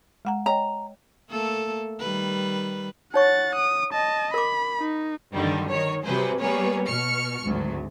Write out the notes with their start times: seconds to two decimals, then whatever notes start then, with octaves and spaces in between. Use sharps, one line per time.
0.25 G#3 F#5 A#5
0.46 C#5 D#5 G5 A#5
1.30 A3 A#3 A4
2.00 D#3 G3 B4
3.14 D#4 C#5 F#5 C#6 A6
3.55 D#6
3.93 D#5 A5
4.34 A#4 B5 D6
4.80 D#4
5.33 G2 D3 D#3 F#3 G3
5.68 D#3 C#5
6.05 C3 F#3 G3 G#4 B4 C5
6.40 G3 A#3 B3 G#4 B4 C#5
6.87 B2 C#6 F6 C#7
7.45 G#1 D2 F#3